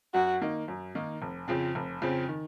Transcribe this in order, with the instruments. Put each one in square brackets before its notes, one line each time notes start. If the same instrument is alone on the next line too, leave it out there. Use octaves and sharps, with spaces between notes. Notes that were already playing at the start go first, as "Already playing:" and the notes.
[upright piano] F#2 [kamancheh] F#4
[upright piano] D#3 A#3 D#4
F#2
D#3 A#3 D#4
F1
F2 C#3 F3 C4
F1
F2 C#3 F3 C4
D#3